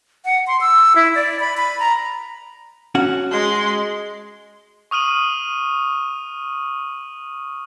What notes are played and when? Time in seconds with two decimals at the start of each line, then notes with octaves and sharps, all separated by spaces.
0.25 F#5
0.47 C6
0.61 E6
0.96 E4
1.15 D5
1.40 B5
1.57 B5
1.80 A#5
2.95 C#4 F#4 F#5
3.31 G#3 C6
4.91 C#6 D#6 F6 D#7 F#7